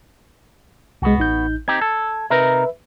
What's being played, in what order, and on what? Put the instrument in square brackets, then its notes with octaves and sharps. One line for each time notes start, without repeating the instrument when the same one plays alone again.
[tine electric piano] C2 G#3 [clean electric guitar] B3 F#4
[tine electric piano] A1 D#4 G6
[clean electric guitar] C4 D#4 G4 [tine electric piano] G#6
[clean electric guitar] A4
[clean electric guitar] C3 D#4 A#4 [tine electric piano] B4 E5